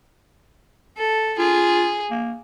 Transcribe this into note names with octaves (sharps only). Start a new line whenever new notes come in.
A4
F4 G#4
A#3